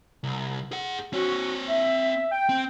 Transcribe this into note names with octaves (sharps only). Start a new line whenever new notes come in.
C2
G#4 F#5
C4 F#4 C#5
E5
G5
C4